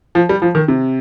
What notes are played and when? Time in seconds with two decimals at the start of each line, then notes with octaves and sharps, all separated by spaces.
0.15 F3
0.29 G3
0.42 F3
0.55 D#3
0.68 C3